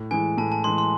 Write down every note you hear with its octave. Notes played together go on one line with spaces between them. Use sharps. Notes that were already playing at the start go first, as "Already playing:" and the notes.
Already playing: A2
E3 G#3 G#5
A2 A5
A5
E3 G#3 C6
C6